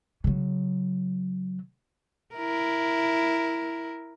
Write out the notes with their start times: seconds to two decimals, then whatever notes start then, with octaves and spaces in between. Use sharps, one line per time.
0.24 C#3 F#3
2.35 E4 A#4